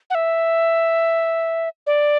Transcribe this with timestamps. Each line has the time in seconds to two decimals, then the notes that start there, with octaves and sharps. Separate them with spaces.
0.10 F#5
0.15 E5
1.87 D5